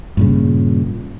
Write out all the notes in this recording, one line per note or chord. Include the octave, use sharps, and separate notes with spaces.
G2 A#2 C#3